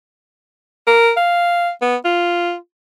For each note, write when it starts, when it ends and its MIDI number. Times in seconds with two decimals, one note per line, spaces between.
0.87 1.11 70
1.17 1.70 77
1.82 1.96 59
2.05 2.55 65